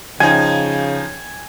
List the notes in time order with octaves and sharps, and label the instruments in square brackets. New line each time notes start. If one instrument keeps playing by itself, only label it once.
[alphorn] C#3 [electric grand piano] F3 D#4 [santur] G#5